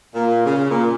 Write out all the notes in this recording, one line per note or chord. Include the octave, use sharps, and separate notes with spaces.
A#2
C#3
A#2